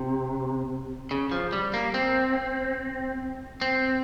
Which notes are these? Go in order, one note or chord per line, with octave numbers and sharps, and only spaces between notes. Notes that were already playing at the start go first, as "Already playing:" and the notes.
Already playing: C3
C#3
F3
G3
A#3
C4
C4